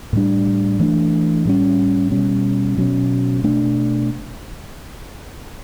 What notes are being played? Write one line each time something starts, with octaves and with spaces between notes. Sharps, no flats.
A2 G3 D4
E3 A3 D4
A2 G3 C#4
B2 G3 C#4
B2 F#3 C#4
B2 A3 D4